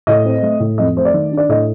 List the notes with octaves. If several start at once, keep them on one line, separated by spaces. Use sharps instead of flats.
A2 D#5
C4
A3
A2
F2 D#5
A3 C5
D5
D#3
D4
D5
A2 D#5